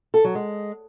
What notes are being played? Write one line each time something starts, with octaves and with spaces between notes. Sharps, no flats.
A4
F#3
G#3